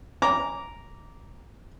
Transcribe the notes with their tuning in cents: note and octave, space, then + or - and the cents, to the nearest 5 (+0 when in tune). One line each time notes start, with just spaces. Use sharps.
A#5 +0 D6 -15